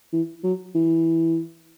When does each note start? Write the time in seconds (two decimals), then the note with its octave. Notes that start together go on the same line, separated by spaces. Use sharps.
0.12 E3
0.44 F#3
0.74 E3